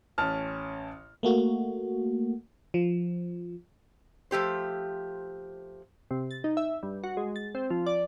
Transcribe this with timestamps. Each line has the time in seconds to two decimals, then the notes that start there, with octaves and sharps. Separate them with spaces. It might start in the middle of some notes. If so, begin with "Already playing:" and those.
0.18 A1 C#4 A5 F6
1.23 A3 A#3 F#4
2.74 F3
4.31 F3 A3 G4 C5
6.11 C3
6.31 A6
6.44 D#4
6.57 E5
6.83 G2
7.04 F#4
7.17 G#3
7.36 A6
7.55 C4
7.70 F3
7.86 D5